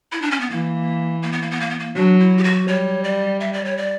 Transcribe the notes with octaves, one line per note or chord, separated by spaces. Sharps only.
E4
D4
C#4
B3
E3 A#3
A#3
B3
A#3
B3
A#3
B3
A#3
F#3 D4
E4
G4
F#4
G3 C#5
D5
E5
D5
C#5
D5